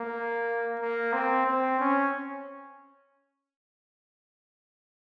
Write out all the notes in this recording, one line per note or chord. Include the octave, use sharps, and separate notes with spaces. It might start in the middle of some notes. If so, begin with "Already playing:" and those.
Already playing: A#3
A#3
C4
C4
C#4